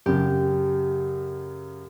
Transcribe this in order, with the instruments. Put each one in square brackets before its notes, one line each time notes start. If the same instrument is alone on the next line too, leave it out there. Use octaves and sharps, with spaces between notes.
[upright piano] F#2 C#3 [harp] G4